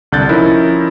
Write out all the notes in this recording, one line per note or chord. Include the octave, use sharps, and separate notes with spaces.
C2 D3 F#6 G6 A6
F3 C#4 D#4 E4 A#4